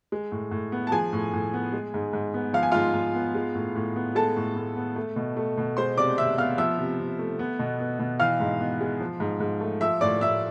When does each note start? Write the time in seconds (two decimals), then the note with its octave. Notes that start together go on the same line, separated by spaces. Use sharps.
0.12 G#3
0.32 A2
0.51 A2
0.72 B3
0.87 A5
0.92 F3 G#4 G#5
1.13 A2
1.33 A2
1.54 B3
1.73 G#3
1.94 G#2
2.13 G#2
2.34 B3
2.53 F3 F5
2.63 G#5
2.72 G#2 F4 F5
2.94 G#2
3.14 B3
3.35 G#3
3.55 A2
3.75 A2
3.96 B3
4.15 G#3 A4 A5
4.36 A2
4.56 A2
4.76 B3
4.96 A3
5.16 B2
5.37 A3
5.57 B2
5.77 G#3 C5 C6
5.97 C3 D5 D6
6.18 C3 E5 E6
6.38 B3 F5 F6
6.58 F3 E5 E6
6.79 C3
6.99 C3
7.19 A3
7.39 B3
7.59 B2
7.80 B3
7.99 B2
8.20 E3 F5 F6
8.40 G#2
8.61 B3
8.81 G#3
9.00 F3
9.20 G#2
9.40 G#2
9.61 A3
9.81 F3 E5 E6
10.01 A2 D5 D6
10.21 A2 E5 E6